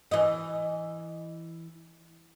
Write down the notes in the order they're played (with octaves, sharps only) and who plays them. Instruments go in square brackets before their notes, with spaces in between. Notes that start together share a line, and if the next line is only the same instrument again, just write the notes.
[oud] E3 D#5